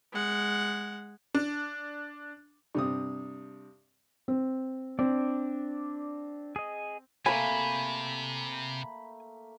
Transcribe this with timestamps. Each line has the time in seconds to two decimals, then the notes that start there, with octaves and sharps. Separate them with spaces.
0.12 G#3 F#5
1.35 D4
2.75 G2 C3 D#6
4.28 C4
4.99 C4 D4 D5
6.56 G#4 D#5
7.26 C3 A3 A#3 G5 G#5 B5